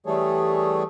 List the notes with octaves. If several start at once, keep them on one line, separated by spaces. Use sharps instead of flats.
E3 G3 A3 G#4 A4 C#5